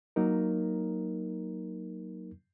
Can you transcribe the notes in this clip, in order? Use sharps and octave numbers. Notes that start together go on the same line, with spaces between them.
F#3 A#3 D#4 A#4